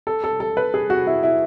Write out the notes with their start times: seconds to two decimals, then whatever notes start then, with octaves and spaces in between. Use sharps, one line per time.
0.07 A4
0.24 A4
0.40 A4
0.57 B4
0.74 G#4
0.90 F#4
1.07 E4
1.23 E4